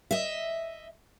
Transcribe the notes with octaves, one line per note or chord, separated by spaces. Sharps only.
D#5 E5